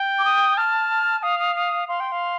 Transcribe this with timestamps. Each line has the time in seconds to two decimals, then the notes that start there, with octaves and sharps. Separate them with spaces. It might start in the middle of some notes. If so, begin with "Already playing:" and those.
Already playing: G5
0.19 D6
0.25 D#6
0.57 A5 F6
1.23 F5 D#6
1.39 D#6
1.56 D#6
1.89 F5 C6
2.00 G5
2.12 F5